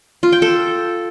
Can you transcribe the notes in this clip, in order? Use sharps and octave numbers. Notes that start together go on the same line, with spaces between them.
F4
G5
A4